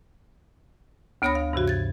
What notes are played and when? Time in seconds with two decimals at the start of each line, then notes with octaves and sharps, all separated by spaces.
1.22 D2 B3 C#5 B5 D#6 A#6
1.35 F5
1.53 G2 C3 E3 F#4
1.68 G#6 A6